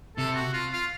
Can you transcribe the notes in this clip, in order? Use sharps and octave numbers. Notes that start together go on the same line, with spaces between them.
C3 A4
F#4
F4
F4